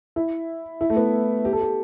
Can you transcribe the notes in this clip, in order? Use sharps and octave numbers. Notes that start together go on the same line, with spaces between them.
E4
E4
A3
B3
G4
A4
G4